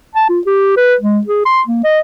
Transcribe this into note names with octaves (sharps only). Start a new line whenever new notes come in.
A5
F4
G4
B4
G#3
G#4
C6
A#3
D#5